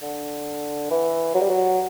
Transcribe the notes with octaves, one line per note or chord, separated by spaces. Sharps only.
D3
E3
F#3
G3
F#3